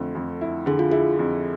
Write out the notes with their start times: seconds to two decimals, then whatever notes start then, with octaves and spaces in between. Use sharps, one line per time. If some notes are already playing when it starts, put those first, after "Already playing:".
Already playing: F2 D3 A3
0.15 F2
0.41 E4
0.66 D3 G#4
0.79 F4
0.91 E4 G#4
1.19 F2